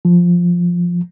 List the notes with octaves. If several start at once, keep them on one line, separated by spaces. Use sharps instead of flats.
F3